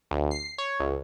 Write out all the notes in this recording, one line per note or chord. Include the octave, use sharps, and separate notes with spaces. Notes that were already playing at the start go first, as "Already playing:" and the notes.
D2
C7
C#5
C#2